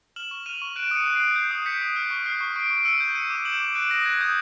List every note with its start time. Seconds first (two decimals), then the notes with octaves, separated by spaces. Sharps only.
0.16 F6 E7 F#7
0.31 C#6
0.46 F6 D#7 F7
0.62 C#6
0.76 F#6 D7 E7
0.91 D#6 C#7 D#7
1.06 F#6
1.15 C7 D7
1.21 D#6
1.36 G6 C7
1.51 D#6
1.66 G6 B6 C#7
1.81 D#6
1.96 F6
2.11 C#6
2.26 F6 C7
2.41 C#6
2.56 C#6 C7 D7
2.70 C#6
2.77 D7
2.85 E6 C#7 D#7
3.00 G6
3.15 G6 C#7 D#7
3.30 D6
3.45 G6 E7 F#7
3.60 D6
3.75 F#6 D7 E7
3.90 D#6 A#6
4.05 F#6 G#6
4.20 D#6 G6